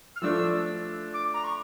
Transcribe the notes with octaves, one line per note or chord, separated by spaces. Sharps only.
F6
F3 A3 D4 E6
D6
A#5
C#6